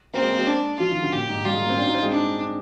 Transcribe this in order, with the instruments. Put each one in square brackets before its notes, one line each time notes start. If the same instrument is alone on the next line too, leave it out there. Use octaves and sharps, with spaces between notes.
[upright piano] A#3 [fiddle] C4
[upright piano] G#3
A#3
G#3
[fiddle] D4
[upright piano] F3 [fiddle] F4
[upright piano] D#3
D3
[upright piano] A#2 [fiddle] G4
[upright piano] G#2
[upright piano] G3 [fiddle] F4
[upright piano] G#3
A#3
C4
D4
D#4
C4
G#3
[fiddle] D4